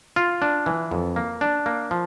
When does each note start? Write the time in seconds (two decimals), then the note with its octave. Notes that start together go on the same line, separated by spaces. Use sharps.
0.16 F4
0.42 D4
0.66 E3
0.91 F2
1.16 A#3
1.41 D4
1.66 A#3
1.91 F3